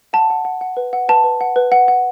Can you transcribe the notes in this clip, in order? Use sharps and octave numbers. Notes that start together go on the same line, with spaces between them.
F#5 A5
F#5
F#5
F#5
B4
F#5
B4 A5
B4
F#5
B4
F#5
F#5